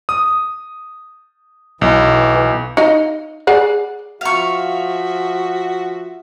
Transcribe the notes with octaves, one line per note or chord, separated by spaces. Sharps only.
D#6
B1 E3
D#4 D#5 F5
G#4 D5 F#5
F3 F#4 E5 F5 C#6